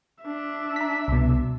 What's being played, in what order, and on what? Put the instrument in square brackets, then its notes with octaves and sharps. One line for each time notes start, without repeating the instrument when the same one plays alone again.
[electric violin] D4 E5
[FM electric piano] A#5 B6
C2 B2